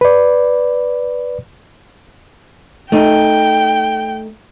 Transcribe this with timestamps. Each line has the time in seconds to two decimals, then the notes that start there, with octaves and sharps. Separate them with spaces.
0.01 B4 D5
2.92 A3 D#4 G5